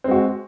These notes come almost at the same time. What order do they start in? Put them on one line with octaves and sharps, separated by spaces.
C4 G#3 F#4